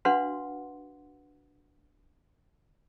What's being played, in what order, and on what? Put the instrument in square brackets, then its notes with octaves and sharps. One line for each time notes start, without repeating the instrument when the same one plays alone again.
[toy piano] D4 F#4 B4 F5 F#5 C6